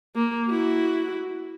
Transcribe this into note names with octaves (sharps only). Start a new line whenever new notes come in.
A#3
E4 F#4